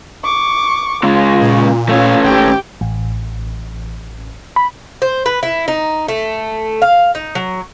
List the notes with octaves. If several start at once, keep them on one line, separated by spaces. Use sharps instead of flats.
C#6 D6
C#3 G#3 F4
A#2
A3 C#4 F4 F5
G#1 G4 G5
A1
B5
C5
B4
E4
D#4
A3
F5
D#4
F#3